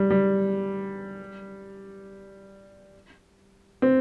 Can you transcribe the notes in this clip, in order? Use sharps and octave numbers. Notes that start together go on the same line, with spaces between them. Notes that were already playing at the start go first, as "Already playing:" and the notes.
Already playing: G3
G3
C4